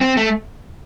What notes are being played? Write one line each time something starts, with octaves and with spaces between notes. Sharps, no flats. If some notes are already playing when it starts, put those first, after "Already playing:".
C4
A3